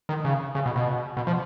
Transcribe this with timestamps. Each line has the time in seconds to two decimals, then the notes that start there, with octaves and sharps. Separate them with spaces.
0.09 D#3
0.25 C#3
0.55 C#3
0.66 B2
0.76 B2
1.17 B2
1.27 F3